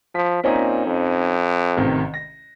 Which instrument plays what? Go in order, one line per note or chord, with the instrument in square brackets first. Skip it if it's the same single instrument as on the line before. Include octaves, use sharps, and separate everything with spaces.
[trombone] F3 [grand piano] B6
[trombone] A#2 [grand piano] C4 C#4 D#4
[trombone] F2
[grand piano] A1 C3 D#3
A#6